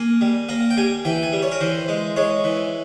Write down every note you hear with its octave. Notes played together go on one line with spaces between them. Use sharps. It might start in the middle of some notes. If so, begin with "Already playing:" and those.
Already playing: A#3 G#5
G3
A#3 A#5
G5
G3 G#5
E3 G5
G#5
G3
C#5
A#4
E3 C5
G#3
G#3 C#5
E3